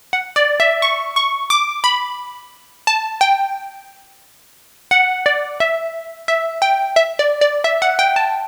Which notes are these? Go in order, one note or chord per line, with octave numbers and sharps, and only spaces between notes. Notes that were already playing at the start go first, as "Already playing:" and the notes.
F#5
D5
E5
C#6
C#6
D6
B5
A5
G5
F#5
D5
E5
E5
G5
E5
D5
D5
E5
F#5
G5
A5